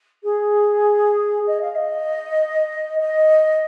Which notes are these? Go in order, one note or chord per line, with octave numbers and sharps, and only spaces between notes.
G#4
D#5
F5
D#5
D#5